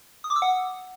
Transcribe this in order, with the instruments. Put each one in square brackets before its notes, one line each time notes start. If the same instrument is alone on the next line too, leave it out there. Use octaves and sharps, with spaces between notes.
[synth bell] D#6
D6
E6
F#5